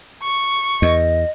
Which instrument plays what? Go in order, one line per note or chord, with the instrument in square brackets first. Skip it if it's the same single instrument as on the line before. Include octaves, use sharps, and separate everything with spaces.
[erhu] C#6
[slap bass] E2 [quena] D#5